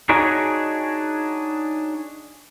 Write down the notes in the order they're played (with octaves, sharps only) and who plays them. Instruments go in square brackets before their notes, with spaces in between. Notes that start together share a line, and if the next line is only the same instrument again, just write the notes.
[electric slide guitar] D4 D#4 F#4 G#4 C#5 D#5